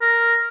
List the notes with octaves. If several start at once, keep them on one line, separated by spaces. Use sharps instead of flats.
A#4